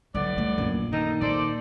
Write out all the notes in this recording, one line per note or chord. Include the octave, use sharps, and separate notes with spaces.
A2 D3 F#3 B3 D5
G3 A3
A#1 F#2 A#2
D#3 D#4 A4
A#2 A4 C5 D5